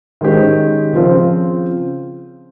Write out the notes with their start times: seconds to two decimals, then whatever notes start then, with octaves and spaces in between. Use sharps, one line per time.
0.21 D#3 G#3 C#4 G4 C5
0.93 C#3 F3 C4 F4 C5